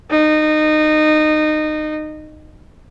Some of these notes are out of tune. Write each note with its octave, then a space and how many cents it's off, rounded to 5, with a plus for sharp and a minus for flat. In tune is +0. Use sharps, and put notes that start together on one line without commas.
D#4 -20